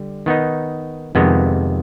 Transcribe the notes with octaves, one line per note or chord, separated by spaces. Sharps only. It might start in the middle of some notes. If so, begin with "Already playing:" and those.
Already playing: D3 G3
D#3 B3 D#4
F2 C3 D#3 G#3 B3